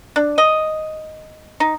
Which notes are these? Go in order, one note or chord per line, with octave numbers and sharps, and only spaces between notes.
D4
D#5
D#4